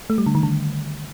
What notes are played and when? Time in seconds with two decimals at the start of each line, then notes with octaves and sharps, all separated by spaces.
0.10 A3
0.18 G3
0.26 D3
0.35 D#3
0.43 D3